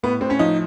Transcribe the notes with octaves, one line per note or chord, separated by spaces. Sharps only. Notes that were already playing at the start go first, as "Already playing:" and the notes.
A2 B3
A2 C4
C#4
F3 D#4